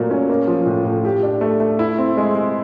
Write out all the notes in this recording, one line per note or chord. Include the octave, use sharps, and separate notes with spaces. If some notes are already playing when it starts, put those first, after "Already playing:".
Already playing: A#2 F#3 A3
C#4
A#3
F3
A2
A2
G4
D4
A3
A3
E4
C4
G#3
G#3